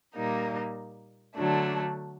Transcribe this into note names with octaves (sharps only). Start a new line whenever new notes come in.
A#2 G3 A#3 D#4
D3 F#3 A3 D4